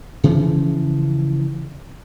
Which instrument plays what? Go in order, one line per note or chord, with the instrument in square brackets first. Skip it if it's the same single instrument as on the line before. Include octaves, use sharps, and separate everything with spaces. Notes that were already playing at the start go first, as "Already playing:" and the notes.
[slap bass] C#3 E3 F3